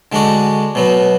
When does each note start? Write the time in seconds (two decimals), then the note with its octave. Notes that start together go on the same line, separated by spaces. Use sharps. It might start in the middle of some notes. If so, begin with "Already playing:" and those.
0.12 D3 G#3 D4 F#4
0.75 B2 F#3 B3